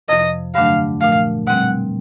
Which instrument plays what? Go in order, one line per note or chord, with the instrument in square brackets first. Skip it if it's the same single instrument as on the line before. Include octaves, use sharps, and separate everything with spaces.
[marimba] F2 C3 F3 [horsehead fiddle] D#5
[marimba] G2 D3 F#3 A3 D4 [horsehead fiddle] F5
[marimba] A#2 F3 A3 [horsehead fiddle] F5
[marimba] B2 G3 C4 [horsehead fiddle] F#5